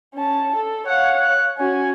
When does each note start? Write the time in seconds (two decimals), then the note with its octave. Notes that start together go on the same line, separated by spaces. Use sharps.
0.15 C#4 A5
0.56 A4
0.87 C#5 F5 F#5
1.16 F#6
1.58 C#4 F#4 G#5